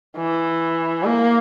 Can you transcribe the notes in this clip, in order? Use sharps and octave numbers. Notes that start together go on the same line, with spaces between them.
E3
A#3